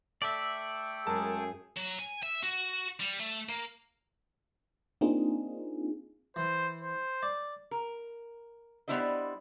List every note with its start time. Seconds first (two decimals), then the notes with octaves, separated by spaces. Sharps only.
0.22 A3 A4 D5 E5 G5
1.07 F#2 G#3 G#4 A#4 A5
1.76 F#3
1.99 G#5
2.23 E5
2.43 F#4
3.00 G3
3.19 A3
3.49 A#3
5.01 A#3 C4 D4 D#4 F4 G#4
6.36 E3 C5
6.81 C5
7.23 D5
7.71 A#4
8.88 G3 B3 D4 E4 C5 D#5